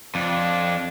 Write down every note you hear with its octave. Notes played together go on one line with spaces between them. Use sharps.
F2 D4